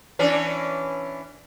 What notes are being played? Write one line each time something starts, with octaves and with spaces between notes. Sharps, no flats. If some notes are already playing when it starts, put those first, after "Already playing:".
E3 C#4 D4